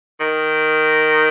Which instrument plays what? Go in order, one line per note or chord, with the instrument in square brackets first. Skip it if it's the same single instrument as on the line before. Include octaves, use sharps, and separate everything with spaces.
[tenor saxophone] D#3